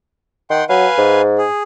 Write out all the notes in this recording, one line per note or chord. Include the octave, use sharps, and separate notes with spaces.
D#3 F#5 G5 C6
F#3 B4 F5 G#5
G#2
G#4